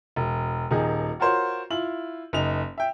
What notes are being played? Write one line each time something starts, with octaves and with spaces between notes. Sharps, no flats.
E1
D#1 D#3 D#4 G#4
F4 F#4 A#4 C5 C#5
E4 F4 F#7
F#1 D#4 F7
E5 G5